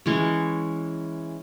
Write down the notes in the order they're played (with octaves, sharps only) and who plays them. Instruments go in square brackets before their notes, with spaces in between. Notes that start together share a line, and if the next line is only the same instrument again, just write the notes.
[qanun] E3 G#3 C#4